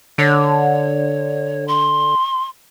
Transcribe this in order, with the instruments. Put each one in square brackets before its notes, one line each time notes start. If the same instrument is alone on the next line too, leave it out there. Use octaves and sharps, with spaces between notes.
[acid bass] D3 [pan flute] C#5
[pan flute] C6